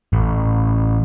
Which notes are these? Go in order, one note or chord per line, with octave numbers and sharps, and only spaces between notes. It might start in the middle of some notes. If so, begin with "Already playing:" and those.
A1